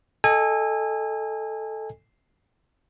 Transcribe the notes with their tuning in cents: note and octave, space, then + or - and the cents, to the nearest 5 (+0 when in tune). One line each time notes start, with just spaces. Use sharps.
A4 +0 D#5 +0 G#5 -25